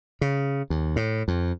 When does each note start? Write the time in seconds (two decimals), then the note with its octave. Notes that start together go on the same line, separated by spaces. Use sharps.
0.21 C#3
0.70 D#2
0.96 A2
1.28 F2